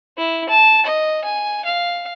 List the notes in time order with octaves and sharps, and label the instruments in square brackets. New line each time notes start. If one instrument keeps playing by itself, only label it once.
[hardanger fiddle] E4
A5
D#5
G#5
F5